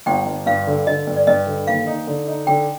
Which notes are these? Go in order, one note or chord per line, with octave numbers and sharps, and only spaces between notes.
G1 G5
G1
G2 F5
D3
D3 D#5
G2
D5
G2 D#5
D3
D#2 F5
D#4
D3
D#4
D3 G5